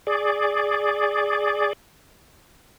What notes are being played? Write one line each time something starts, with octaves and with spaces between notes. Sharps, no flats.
G#4 D5